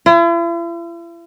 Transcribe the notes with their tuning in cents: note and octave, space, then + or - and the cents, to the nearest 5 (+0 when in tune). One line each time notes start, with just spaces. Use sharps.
E4 +45